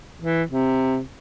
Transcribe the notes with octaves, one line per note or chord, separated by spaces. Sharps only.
E3
C3